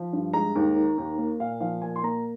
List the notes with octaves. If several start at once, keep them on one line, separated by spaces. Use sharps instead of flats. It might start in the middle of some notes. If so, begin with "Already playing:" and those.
Already playing: F3
G2
G#3 A#5
D#2
D#3
D#2
A#3
A#2 F5
F3 F5
A#2 G#5
C6
A#3 A#5